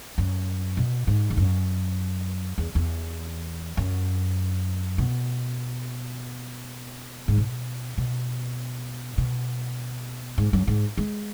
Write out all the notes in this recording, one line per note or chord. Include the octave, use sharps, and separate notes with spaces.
F#2
B2
G#2
E2
F#2
E2
E2
F#2
B2
G#2
B2
B2
B2
G#2
F#2
G#2
G#3